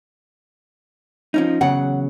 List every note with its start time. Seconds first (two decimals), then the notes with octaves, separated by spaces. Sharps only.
1.34 F3 C#4 D#4
1.61 E2 C#3 F#3 F#5